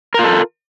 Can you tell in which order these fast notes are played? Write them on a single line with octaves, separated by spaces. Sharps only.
A#4 F4 A4